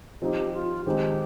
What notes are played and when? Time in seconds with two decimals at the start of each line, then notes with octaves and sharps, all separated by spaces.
0.21 F3 C4 D#4 G4
0.53 F4
0.86 D#3 G#3 C4 D#4 G4